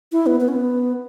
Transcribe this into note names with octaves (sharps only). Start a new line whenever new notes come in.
E4
B3
B3
C#4
B3